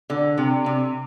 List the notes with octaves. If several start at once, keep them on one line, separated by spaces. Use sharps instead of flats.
D3
C3
C3